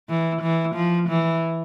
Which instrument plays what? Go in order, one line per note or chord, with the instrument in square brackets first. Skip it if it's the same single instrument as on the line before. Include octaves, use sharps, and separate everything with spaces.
[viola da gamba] E3
E3
F3
E3